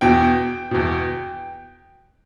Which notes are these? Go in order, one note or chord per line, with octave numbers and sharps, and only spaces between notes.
E2 B2 G5
E2 B2